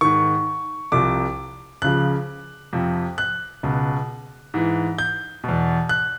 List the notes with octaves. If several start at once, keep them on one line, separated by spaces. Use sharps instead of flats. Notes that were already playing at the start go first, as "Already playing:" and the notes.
G#2 D#3 C#6
C2 C3 F3 D6
C#2 C#3 F3 F#6
F2 C3 F3
F#6
C#2 B2
G#2 E3
G6
E2 B2
F#6